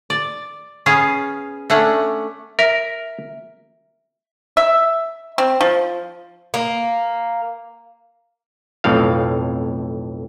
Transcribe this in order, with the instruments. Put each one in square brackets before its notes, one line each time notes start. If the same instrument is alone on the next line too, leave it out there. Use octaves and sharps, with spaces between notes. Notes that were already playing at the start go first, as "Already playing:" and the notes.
[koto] D5
B3 C#4 G#4 F5
A3 C#4 D4 F#5
[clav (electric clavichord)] A#4 [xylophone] E5
[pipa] E5
C4
F3
[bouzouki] A#3
[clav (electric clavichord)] B1 F2 A2 F5